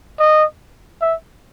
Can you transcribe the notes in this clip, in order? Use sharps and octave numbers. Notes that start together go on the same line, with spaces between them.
D#5
E5